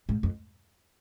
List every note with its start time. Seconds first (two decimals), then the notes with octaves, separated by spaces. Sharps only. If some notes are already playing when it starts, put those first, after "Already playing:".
0.09 G#2
0.23 F2